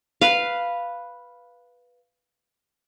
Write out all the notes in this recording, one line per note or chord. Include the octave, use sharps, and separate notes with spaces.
B4 F5